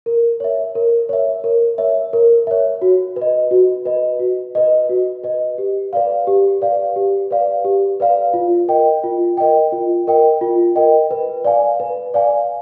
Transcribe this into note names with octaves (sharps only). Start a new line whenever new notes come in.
A#4
C#5 E5
A#4
C#5 E5
A#4
C#5 E5
A#4
C#5 E5
F#4
B4
D#5
F#4
B4 D#5
F#4
B4 D#5
F#4
B4 D#5
G4
B4 D5 F5
G4
B4 D5 F5
G4
B4 D5 F5
G4
B4 D5 F5
F4
A#4 D#5 G5
F4
A#4 D#5 G5
F4
A#4 D#5 G5
F4
A#4 D#5 G5
B4
D5 F5 G#5
B4
D5 F5 G#5